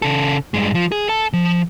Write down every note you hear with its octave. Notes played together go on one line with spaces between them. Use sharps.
C#3 A4
G2 G#3
F3
G#4
A4 A5
F3